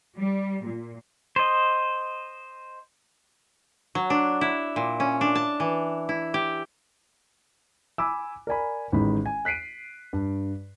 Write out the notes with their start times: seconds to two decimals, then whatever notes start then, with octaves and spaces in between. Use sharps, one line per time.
0.17 G3
0.64 A#2
1.36 C5 D#5
3.95 F#3
4.10 D4
4.41 E4
4.76 A#2
5.00 C#4
5.21 D4
5.35 A5
5.60 E3
6.09 E4
6.34 G4
7.98 G#5 B5 D6 E6
8.47 A#4 D5 G#5 B5
8.92 A1 D#3 G#3 B5
9.26 G#5
9.45 F#6 B6 C7 D7 D#7
10.13 G2